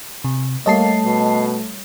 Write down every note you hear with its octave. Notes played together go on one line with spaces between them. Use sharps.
C3
G3 A3 A#3 C#5 D#5 A5 C7
B2